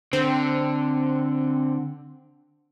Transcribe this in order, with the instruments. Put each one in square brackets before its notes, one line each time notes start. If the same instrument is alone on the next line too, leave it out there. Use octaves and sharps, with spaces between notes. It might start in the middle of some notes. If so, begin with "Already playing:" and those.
[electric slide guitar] D3 [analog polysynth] C4